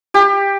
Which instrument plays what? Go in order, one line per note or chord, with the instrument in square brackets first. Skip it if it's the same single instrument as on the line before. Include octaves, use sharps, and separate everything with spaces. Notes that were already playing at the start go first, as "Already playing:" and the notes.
[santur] G4